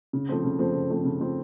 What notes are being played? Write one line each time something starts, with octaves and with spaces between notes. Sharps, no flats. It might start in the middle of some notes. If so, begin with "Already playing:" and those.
C#3
F3 A3 C4
C#3
F3 A3 C4
C#3
F3 A3 C4
C#3
F3 A3 C4